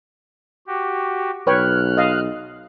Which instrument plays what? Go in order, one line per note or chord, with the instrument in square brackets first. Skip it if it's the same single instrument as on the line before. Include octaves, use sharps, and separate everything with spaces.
[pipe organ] F#4 G4
[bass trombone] B1 [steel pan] B4 C#5 G5 [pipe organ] F6 F#6
[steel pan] D#5 F5